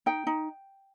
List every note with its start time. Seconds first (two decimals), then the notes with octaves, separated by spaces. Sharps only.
0.06 D#4 G5
0.27 D#4